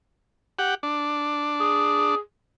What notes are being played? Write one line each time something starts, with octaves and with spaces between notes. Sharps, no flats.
G4 F#5
D4
G#4